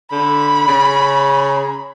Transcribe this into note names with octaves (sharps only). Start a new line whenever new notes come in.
D3 B5
C#3